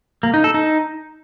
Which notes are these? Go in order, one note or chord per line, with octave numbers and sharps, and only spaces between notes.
A#3
D#4
A4
D#4